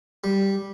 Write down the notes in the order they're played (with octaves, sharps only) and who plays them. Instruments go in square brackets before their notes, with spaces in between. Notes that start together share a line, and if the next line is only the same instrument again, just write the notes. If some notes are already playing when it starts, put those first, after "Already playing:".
[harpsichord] G3